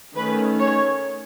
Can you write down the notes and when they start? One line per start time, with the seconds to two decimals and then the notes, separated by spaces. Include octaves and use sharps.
0.15 D#3 A3 C#4 B4
0.60 C#5